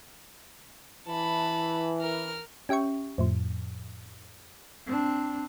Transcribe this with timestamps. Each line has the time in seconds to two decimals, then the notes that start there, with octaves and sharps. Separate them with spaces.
1.07 E3 A5 B5
2.02 A#4 F6
2.69 C#4 G4 E5 G5 C#6
3.18 F2 A2 F3
4.87 C4 D4